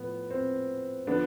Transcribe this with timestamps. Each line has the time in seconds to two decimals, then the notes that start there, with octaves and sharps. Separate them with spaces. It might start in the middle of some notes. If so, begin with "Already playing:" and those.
Already playing: A2 F3 B3
0.31 C4
1.07 D3 F3 B3 D4